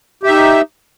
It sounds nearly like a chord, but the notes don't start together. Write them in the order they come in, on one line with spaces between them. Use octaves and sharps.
G4 E5 D#4